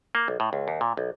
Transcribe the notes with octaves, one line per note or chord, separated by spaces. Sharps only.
A#3
B1
A2
C#2
D#2
A#2
B1